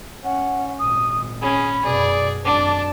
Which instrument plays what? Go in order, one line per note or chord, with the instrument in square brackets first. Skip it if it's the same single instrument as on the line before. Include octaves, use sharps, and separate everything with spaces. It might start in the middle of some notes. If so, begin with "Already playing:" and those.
[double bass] C#4 [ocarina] F#5
[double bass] G#1 A#2 [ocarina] D#6
[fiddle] C#4 [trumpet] G#4 [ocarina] B5
[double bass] F#2 B2 [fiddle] G#4 [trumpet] D5
[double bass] G#1 F#2 [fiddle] D4 [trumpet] A5 [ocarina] D6